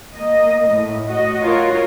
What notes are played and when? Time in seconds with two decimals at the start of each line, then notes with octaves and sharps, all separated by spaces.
0.16 A#3 D#5
0.70 A2
1.08 F#4 D#5
1.44 F4 F#4 A#4 C#5